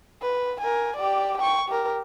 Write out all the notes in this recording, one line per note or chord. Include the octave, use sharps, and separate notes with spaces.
B4
A#4 G#5
G4 D5
G5 C#6
G4 A#4